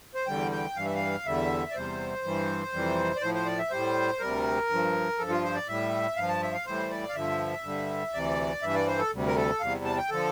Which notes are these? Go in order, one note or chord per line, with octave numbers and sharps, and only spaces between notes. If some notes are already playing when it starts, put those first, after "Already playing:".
C5
E2 D3 G3 G5
G5
G2 E3 G3 F5
E5
F5
E2 D3 G3 E5
D5
E2 C3 G3 C5
G2 E3 G3
F2 C3 E3 G3
D5
A2 F3 C5
C5
D5
E5
A2 G3 C5
D2 C3 G3 A#4
G2 F3
G2 F3 A4
F4
C5
D5
A2 G3 E5
G2 F3 F5
A5
E5
F5
A2 E3 G3 C5
D5
F5
G2 D3 F3 E5
G2 D3 G3
D2 C3 E3 D5
G2 E3 G3 E5
D5
C5
A4
D2 C3 G3
A#4
A4
E2 C3 G3 F5
A5
G5
D3 F3 A4